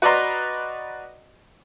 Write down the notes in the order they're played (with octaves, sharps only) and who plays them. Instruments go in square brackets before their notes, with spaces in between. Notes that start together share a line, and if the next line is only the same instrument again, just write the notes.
[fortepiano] F#4 B4 D5 D#5 A#5 C6